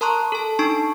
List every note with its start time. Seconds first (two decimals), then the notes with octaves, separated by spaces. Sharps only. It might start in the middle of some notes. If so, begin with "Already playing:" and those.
0.01 A#4 A5 A#5 C6 C#6 F#6
0.32 A4 A5
0.59 D4 D#4 A5 C#6 D7